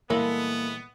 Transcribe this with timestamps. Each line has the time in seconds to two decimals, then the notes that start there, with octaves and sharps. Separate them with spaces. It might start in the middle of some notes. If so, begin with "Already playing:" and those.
0.10 A#2 E3 G3 G#3 A#3 B3 E4 A4